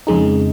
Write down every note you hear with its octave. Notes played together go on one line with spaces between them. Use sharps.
F2 C#3 G#3 D#4